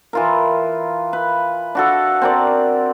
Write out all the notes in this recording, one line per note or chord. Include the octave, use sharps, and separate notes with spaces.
E3 F4 A#4
B4
D4 F#4 A4
C4 A#4 D5